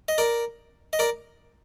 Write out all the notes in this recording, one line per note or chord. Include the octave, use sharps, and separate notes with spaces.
D#5
A#4 D5
D#5
A#4 D5